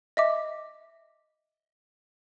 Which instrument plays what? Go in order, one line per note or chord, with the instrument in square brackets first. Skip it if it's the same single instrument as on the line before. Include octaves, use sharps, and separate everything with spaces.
[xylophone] D#5 E5 D6